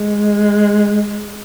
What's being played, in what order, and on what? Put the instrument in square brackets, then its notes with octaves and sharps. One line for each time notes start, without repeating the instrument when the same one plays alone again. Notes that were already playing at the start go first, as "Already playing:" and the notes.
Already playing: [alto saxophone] G#3